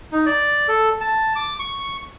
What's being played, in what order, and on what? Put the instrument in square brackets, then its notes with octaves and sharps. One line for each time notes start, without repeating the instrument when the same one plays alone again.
[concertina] D#4
D5
A4
A5
D6
C#6